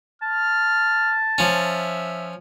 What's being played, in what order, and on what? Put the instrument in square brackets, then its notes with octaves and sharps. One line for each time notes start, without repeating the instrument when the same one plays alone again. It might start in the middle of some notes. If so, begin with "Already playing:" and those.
[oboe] A5 [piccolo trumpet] F6
[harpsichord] F3 C#4 [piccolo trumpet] E5